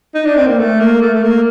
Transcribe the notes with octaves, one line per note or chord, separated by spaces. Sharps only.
D#4
D4
C4
A#3
A3
A#3
A3
A3
A#3